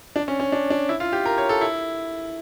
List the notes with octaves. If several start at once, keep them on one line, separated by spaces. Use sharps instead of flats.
D4
C#4
C#4
D4
D4
E4
F4
G4
A#4
C#5
A4
E4